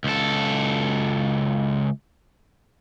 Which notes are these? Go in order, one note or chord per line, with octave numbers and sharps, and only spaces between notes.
C#2 A4